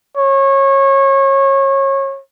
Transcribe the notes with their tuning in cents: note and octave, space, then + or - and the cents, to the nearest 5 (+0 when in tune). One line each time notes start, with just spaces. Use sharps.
C#5 -25